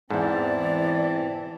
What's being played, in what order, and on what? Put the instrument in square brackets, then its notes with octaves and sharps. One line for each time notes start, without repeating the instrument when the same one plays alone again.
[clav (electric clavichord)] E2 G#2 [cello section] E3 [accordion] C4 A5 [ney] D5